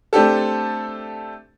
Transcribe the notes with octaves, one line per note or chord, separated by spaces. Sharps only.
A3 C4 D4 G4 A4